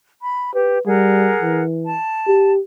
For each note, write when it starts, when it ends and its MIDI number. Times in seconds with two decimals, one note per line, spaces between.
0.22 0.54 83
0.54 0.77 67
0.54 0.80 71
0.86 1.33 55
0.86 1.62 68
0.86 1.62 70
0.86 1.62 78
1.42 1.96 52
1.84 2.50 81
2.27 2.60 67